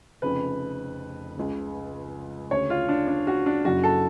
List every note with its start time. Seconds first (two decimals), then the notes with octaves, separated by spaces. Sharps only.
0.22 F1 F2 C#3 B4
1.37 C#2 C#3
2.51 D2 C#3 C#5
2.70 F4
2.89 D4
3.08 D4
3.27 F#4
3.46 D4
3.64 F#1 F#2 C#3 F#4
3.84 A4